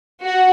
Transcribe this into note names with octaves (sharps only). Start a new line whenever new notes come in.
F#4